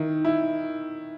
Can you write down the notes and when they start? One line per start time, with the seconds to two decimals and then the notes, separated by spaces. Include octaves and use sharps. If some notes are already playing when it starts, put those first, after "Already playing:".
Already playing: D#3 E4
0.25 E4